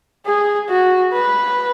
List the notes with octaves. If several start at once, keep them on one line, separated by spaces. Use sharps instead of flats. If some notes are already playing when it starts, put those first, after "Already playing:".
G#4
F#4
B4